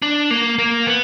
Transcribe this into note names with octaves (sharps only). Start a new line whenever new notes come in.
D4
A#3
A#3
B3